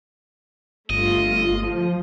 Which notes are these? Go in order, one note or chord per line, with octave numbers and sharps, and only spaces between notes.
G1 A3 F4 D#5
F3